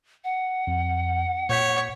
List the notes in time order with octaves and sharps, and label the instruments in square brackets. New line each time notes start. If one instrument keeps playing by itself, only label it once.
[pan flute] F#5
[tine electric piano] F2
[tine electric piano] A#2 G6 B6 [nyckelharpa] C#5